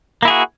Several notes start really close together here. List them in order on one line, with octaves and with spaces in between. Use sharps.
A#3 E4 G#4 F#4